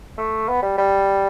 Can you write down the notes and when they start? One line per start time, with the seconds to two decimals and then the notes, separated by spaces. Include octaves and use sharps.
0.18 A3
0.49 B3
0.63 G3
0.78 G3